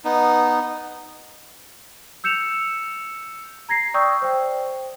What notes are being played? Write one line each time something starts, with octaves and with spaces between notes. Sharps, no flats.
B3 D#4
E6 G6 C#7 E7 F7
A#5 G#6 A#6 C7
D5 G5 C#6 D#6 E6 G6
C5 G5